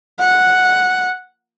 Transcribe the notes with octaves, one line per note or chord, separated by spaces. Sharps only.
F#5